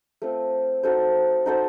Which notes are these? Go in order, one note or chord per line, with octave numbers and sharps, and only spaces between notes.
A3 C4 F4
D#4 F#4 A4 C5
D#4 F#4 A4 C5